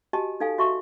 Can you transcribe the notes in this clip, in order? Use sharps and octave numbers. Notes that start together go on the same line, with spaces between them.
F#4 G4 D#5 G#5 A5
D#4 A4 F5 G#5
F#4 D#5 E5 A5 C6 C#6